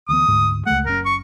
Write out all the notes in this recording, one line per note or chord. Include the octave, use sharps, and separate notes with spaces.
D2 E3 B3 D#6
D2 G#2
C#2 G#3 A3 F#5
F#1 C#4 A#4
C#6